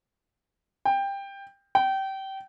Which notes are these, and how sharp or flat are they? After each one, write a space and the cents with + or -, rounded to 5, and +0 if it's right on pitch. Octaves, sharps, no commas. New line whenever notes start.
G5 +15
G5 -25